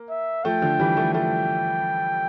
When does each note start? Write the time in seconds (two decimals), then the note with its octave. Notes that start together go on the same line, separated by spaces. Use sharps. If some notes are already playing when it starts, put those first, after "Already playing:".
Already playing: A#3
0.09 E5
0.44 F3 A3 G5
0.62 D3 F3
0.79 E3 G3
0.97 F3 A3
1.14 F3 A3 G5